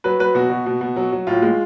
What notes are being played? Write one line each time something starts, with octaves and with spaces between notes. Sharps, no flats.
F#3 B4
F#3 B4
B2 F#4
B2
B2
B2
F#3
F#3
A2 F4
G#3